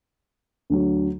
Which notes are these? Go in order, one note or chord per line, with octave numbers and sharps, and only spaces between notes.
D2 D3 F#3